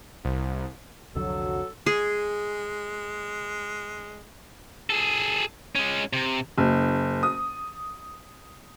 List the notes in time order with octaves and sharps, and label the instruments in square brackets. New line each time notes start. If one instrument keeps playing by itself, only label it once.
[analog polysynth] C2
[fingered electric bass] C2 F2 D3 [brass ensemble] F#3 [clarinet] A4
[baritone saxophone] G#3 [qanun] G#4
[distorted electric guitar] G#4 A4
G#3 C#4
C3
[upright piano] F#1
D#6